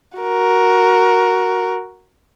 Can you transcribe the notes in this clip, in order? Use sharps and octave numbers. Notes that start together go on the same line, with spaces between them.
F#4 A#4